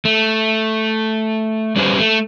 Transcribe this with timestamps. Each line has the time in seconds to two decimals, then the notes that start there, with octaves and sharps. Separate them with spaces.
0.05 A3
1.76 G3 C#4 G4 B4 C5
1.99 A3